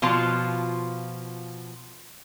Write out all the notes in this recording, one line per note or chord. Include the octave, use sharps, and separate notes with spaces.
B2 F3 F4 A5